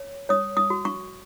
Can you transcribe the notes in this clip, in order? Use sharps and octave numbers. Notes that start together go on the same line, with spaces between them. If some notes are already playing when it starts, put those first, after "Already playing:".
Already playing: C#5
C#5 D#6
D#6
F#4
C#6